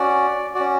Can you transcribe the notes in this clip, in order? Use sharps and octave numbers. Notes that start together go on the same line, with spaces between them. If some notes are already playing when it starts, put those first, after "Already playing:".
Already playing: C#4 F#4 D5
C#4 F#4 D5